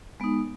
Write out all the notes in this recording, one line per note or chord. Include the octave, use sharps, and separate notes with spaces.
G#3 B3 D#4